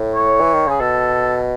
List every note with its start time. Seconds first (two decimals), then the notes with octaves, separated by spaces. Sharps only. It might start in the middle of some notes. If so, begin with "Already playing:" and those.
Already playing: A2
0.15 C#5
0.41 E3
0.54 D#3
0.67 C#3 G#4
0.80 B2 A4